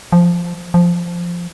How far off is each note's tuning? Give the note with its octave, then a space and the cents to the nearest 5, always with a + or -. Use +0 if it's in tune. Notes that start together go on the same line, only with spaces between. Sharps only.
F3 -5
F3 -5